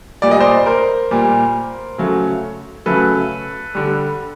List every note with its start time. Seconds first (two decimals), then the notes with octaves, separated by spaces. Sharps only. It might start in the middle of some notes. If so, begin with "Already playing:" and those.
0.22 A#2 G3 D5
0.31 D#5
0.40 C5 D5
0.66 A#4 C5
1.11 A#2 G3
1.98 C#3 F#3 A3
2.86 C#3 F#3 A3 A4 B4
3.75 D3 G3